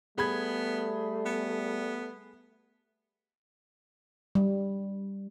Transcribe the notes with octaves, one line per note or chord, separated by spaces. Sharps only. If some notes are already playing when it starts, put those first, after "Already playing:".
G3 A3 B3 G#4 B5 G#6
B3
G3